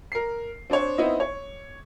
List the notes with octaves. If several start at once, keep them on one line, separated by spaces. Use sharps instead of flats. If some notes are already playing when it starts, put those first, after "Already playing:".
A#4 C7
C4 D4 C5 C#5
B3 C4 D#4 E4 D#5
C#5